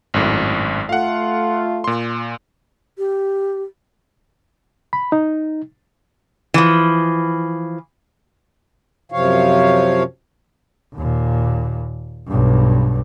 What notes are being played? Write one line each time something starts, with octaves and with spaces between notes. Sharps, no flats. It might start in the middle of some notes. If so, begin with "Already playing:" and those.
G#1 F#2 A2
A3 F4 F5 F#5
A#2 C6
G4
B5
D#4
E3 F3
F#2 C3 F3 C#5 F5
D#2 A#2
B1 G2